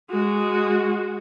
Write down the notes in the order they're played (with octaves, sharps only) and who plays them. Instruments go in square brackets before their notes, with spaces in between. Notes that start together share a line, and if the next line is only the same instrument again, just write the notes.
[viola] G#3 F#4